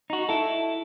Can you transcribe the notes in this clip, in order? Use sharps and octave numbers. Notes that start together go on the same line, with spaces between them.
D#4 F#4
E4 A4